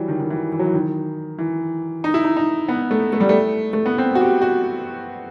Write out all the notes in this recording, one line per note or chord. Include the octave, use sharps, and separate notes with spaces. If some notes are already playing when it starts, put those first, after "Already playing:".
Already playing: E3 F#3 G3
D#3
D#3
E3
E3
F#3
E3
D#3
E3
D#4
E4
D#4
D#4
B3
A3
A3
G3
A3
A3
B3
C4
F#4
G4
F#4